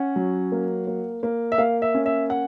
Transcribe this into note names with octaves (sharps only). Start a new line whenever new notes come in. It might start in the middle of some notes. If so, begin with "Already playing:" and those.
Already playing: C#4 F#5
F#3
A#3
A#3
A#3
E5
A#3 F5
E5
C#4
E5
F#5